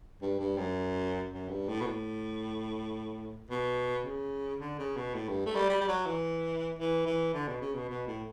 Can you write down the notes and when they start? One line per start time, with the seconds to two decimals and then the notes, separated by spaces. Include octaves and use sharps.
0.22 G2
0.40 G2
0.58 F#2
1.32 F#2
1.49 G2
1.69 A2
1.81 B2
1.87 A2
3.51 B2
4.05 C#3
4.60 D3
4.79 C#3
4.96 B2
5.14 A2
5.29 G2
5.46 A3
5.56 G3
5.70 G3
5.81 G3
5.88 F#3
6.07 E3
6.79 E3
7.06 E3
7.34 D3
7.48 B2
7.61 C#3
7.75 B2
7.89 B2
8.07 A2